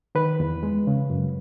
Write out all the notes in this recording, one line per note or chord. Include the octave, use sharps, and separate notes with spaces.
D#3 B4
E2
G#3
C#3
F#2